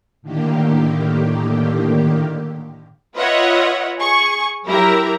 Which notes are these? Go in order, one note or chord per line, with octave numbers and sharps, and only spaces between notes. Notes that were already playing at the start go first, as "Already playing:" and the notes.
A2 D3 D#3 A#3 G4
F4 B4 C#5 D#5 E5 F#5
G#4 C#6
F#3 E4 G4 A#4 E5 A#5